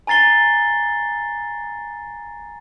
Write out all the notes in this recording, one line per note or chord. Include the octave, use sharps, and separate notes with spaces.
G#5 A#5 A6 C7 G7